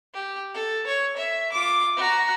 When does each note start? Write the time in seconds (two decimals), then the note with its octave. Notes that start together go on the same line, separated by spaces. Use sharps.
0.14 G4
0.54 A4
0.87 C#5
1.17 E5
1.52 F4 D6
1.97 F#4 A#5